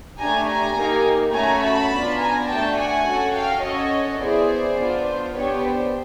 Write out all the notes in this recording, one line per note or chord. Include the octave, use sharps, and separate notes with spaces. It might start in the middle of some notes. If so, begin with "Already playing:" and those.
A3 D4 G4 G#5 A#5
G#5 A#5
A#3 D#4 G4
A3 C#4 F#4 G#5 A#5
A5 B5
B3 D4 F4
G#5 A#5
A3 D4 F#4 G5 A5
F#5 G#5
C#4 F#4 A4
F5 G5
C#4 F#4 A4 C#5 D#5
B3 E4 G#4 C5 D5
B3 D4 F4
C5
B3 D4 G4 B4 C#5
C5